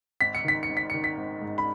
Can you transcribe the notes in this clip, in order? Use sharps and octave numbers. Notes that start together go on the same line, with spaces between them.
G#1 B6
C#7
D#3 B6
C#7
G#1
B6
D#3 C#7
B6
G#1
G#2
B5